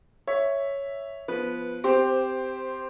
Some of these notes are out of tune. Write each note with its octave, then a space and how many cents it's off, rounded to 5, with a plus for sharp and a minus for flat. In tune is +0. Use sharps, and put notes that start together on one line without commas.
C#5 +0 E5 +0
F3 -5 B3 +0 B4 -15
C4 -15 G4 +0 C5 +0